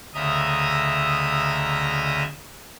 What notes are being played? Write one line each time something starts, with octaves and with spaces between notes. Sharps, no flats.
D2 C#3 D#5 E5 A#5 D#6